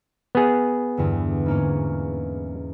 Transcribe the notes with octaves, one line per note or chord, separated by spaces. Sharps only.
B3 G#4
E2 G2 D3
G#2 A#3 C#4